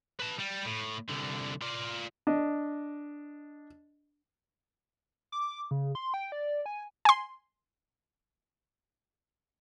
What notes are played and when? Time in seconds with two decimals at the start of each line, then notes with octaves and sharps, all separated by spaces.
0.20 B4 A5
0.39 G3
0.65 A2
1.09 C2 D3
1.61 F4 D5
2.27 D4 D#5
5.32 D6
5.71 C#3
5.95 C6
6.14 G5
6.32 D5
6.66 G#5
7.05 G#5 C6